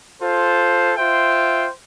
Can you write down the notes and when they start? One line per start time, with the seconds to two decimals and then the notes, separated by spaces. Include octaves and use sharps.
0.21 F4 A4 C5
0.96 F4 C5 E5 G5